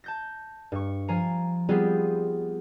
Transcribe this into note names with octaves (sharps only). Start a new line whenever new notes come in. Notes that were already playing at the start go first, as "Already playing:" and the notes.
A5 G6 A#6
G2 C#6
F3 G#5 A#5 C7
G3 B3 C4 F4 G4 G#4